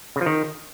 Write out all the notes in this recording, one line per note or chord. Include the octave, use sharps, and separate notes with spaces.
C#3
F3
D#3